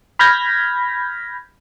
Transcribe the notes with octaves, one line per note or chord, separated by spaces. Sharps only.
B5 F6 G6 G#6 A#6 B6